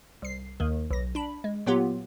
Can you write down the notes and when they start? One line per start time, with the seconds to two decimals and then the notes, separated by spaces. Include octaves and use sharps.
0.22 C2 C7
0.60 D#2 D#3
0.91 B1 A#6
1.15 D4 B5
1.44 G#3
1.66 A#2 F#3 B3 F4 G4